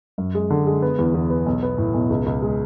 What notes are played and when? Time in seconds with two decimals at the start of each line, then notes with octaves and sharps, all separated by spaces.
0.18 F#2
0.35 G#3
0.50 D3
0.67 G#3
0.82 B3
0.99 E2
1.14 E2
1.30 B3
1.46 B1
1.62 B3
1.78 A2
1.94 B1
2.10 C#2
2.26 C#2
2.42 G#3